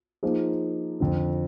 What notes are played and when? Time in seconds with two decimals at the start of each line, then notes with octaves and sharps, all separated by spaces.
0.23 F3 A#3 D#4 G#4 C5
1.00 F2 D3 F3